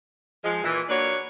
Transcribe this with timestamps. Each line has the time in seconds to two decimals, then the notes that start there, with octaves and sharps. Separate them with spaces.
0.44 F3 G#3
0.63 A#2 E3
0.89 A#3 D4 F#4 B4 C#5